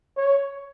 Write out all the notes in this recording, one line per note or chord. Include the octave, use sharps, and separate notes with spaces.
C#5